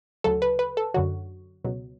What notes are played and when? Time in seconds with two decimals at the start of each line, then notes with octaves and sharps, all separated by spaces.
0.24 D2 C#3 F#3 A4
0.42 B4
0.59 B4
0.77 A4
0.94 F#2 D3 F#3 F#4
1.64 C#2 B2 F#3